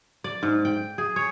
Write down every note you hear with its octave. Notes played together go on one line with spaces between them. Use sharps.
D5
G#2
G5
G#4
C#5